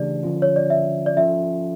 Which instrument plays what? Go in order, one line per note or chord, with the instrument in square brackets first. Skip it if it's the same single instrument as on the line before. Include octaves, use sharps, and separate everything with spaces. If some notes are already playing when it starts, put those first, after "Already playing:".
Already playing: [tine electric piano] C#3 E3 A3 D4 G4 [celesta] D5
[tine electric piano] D3 F3 C#4 F4
[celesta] C#5
D5
E5
D5
[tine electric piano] F3 C#4 F4 A4 [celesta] E5